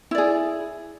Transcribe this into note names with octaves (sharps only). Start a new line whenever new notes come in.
E4 G#4 D5